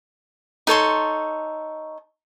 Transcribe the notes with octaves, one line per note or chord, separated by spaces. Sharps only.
D#4 A4 C#5 C6